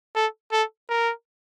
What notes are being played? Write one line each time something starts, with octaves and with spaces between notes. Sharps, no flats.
A4
A4
A#4